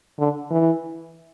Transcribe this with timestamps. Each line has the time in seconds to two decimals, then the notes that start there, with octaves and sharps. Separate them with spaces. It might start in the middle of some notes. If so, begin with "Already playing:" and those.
0.19 D3
0.51 E3